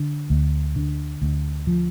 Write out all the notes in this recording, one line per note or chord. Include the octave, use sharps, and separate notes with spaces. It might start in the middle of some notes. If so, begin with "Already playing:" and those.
Already playing: D3
D2
D3
D2
F3